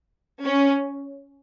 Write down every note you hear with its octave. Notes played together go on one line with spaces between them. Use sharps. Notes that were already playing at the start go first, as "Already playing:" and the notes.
C#4